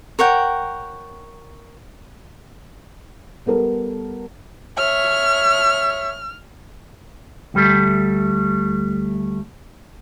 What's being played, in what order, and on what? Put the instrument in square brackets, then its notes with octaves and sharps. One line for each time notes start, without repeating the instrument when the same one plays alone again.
[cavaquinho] A#4 C#5 F#5 G5
[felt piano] G3 B3 A4 A#4
[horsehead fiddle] C#5 E5 [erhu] F6
[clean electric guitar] D2 G3 A3